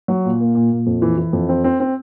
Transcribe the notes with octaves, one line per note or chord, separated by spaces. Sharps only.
F#3
A#2
A#3
A#2
A#2
F2
E3
E3
F2
C4
C4
C4